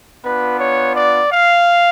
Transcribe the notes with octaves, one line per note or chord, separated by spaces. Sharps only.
B3 D4 F4 B4
C#5
D5
F5